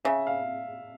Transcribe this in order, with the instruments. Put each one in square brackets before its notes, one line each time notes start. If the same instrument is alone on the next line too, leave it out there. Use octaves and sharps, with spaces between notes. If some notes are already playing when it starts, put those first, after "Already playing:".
[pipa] C#3 [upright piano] E5
[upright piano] F5